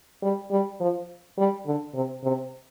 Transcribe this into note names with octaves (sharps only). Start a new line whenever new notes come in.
G3
G3
F3
G3
D3
C3
C3